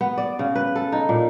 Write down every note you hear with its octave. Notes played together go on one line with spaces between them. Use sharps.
B3
D5
C#3
B4
A4
D#4
A#2